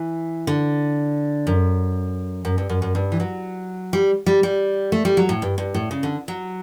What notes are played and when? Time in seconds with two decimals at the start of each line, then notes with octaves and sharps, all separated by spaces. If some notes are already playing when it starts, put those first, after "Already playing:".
Already playing: E3
0.47 D3
1.47 F#2
2.45 F#2
2.58 G2
2.69 F#2
2.82 F#2
2.95 G2
3.12 E3
3.20 F#3
3.93 G3
4.26 G3
4.43 G3
4.92 A3
5.05 G3
5.17 F#3
5.29 A2
5.42 G2
5.58 G2
5.74 A2
5.91 C#3
6.03 D3
6.28 F#3